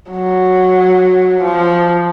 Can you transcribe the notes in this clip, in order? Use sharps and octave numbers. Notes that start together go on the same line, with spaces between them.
F#3
F3